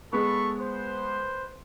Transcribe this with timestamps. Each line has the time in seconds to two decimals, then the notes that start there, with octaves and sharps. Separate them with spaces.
0.13 G#3 B3 A4 B5 C#6
0.60 B4 C5